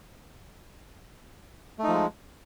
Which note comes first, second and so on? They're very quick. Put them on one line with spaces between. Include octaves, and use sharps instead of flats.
A3 D#4 F3 G#3